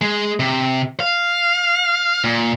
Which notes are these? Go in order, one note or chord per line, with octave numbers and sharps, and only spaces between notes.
G#3
C3
F5
A#2